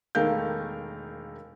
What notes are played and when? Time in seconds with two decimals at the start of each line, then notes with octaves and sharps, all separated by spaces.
0.15 E1 D#3 A3 A#4 F5 G6